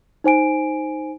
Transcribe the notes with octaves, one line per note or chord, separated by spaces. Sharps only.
D#4 C5 G#5 D7